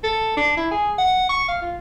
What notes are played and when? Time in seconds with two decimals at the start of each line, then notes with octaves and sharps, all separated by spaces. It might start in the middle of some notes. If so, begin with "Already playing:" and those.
0.04 A4
0.37 D4
0.57 E4
0.71 G#4
0.98 F#5
1.29 C#6
1.48 F5
1.61 F4